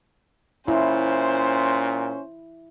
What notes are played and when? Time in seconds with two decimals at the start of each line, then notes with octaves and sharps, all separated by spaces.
0.68 A#2 C#4 E4 C5